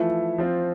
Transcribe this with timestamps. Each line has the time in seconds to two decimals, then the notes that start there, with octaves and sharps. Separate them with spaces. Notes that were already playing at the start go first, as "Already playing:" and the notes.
Already playing: E3 F3 A3 E4
0.38 F3 C4 F4